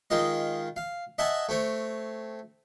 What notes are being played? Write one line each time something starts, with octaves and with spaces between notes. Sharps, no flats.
D#3 G#3 F4 D#5
F5
D#5 E5 F#5 G#5 A5
A3 C4 C#5